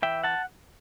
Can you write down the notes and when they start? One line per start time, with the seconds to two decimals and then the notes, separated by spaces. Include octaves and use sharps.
0.02 E3 E5 G5
0.24 F#5 A5